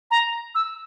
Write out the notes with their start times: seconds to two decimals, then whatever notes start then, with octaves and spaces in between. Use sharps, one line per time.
0.11 A#5
0.55 E6